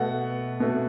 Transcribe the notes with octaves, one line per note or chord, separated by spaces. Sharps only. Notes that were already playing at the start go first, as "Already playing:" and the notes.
Already playing: B2 A3 F#5
B2 A3